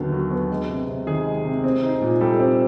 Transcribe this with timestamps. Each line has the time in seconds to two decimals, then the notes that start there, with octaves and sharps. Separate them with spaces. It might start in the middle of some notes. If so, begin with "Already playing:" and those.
Already playing: D#2 D3 F#3 B3
0.12 F#3
0.31 B3
0.50 G#3
0.69 C3
0.88 C3
1.07 D#3 G#4
1.26 G#3
1.45 C3
1.64 C4
1.83 D#4
2.02 A#2
2.20 G3 G4 A4
2.39 C4